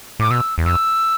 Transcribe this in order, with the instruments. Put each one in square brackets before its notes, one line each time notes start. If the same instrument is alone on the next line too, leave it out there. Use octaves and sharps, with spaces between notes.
[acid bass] A2 [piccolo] D6
[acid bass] B2 [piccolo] E6
[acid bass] E2
[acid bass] F2 [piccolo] E6